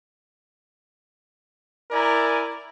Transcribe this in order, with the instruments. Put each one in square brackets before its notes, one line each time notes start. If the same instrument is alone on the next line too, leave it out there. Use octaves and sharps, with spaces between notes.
[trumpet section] E4 A#4 D5 G#5 A#5